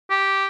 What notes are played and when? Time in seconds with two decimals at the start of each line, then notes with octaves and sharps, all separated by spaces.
0.10 G4